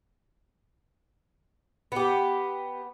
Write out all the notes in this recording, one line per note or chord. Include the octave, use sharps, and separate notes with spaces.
B3 G4